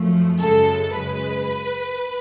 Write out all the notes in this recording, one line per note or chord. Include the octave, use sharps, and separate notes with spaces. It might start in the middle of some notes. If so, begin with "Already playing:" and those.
Already playing: F#2 F3 A3
F#2 C#3 G#3 A4
F#2 C#3 G#3 B4